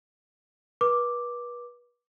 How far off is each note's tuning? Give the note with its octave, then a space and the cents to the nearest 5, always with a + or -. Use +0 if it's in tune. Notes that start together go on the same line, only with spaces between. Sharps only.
B4 -35 D6 +0